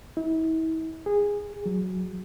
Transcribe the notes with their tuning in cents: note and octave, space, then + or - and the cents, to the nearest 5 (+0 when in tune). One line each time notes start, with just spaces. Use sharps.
E4 -40
G#4 -15
F#3 -5